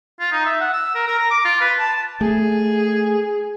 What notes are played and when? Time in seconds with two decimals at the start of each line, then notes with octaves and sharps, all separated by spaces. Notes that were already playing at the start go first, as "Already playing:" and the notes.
0.20 F4
0.32 D#4
0.46 E5
0.60 F#5
0.73 E6
0.95 A#4
1.07 A#4
1.18 A#5
1.30 D6
1.45 F4
1.61 B4
1.79 A5
2.21 A3 G#4